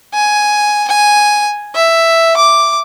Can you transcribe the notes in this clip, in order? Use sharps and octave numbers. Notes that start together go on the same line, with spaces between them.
G#5
G#5
E5
D6